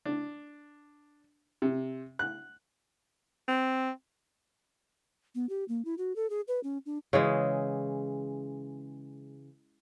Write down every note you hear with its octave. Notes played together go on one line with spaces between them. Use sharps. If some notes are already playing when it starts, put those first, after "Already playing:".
D4
C3
F#6
C4
B3
G4
A#3
E4
F#4
A4
G#4
B4
C#4
D4
C#3 E3 G#3